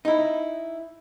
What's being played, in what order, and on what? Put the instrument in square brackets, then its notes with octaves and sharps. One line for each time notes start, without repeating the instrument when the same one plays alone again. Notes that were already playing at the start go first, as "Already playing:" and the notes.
[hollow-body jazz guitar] D#4 E4